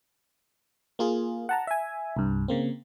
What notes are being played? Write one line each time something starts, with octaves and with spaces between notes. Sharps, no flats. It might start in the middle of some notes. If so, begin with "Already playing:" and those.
A#3 F4 G#4
F#5 A5 A#5
E5 G#5
C2 G2
C#3 A#3 C4